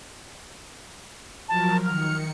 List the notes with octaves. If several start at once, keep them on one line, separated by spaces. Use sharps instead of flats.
F3 F#3 A#4 A5
D#3 F6 C#7